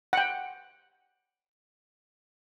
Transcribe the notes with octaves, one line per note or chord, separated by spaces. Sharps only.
F#5 G5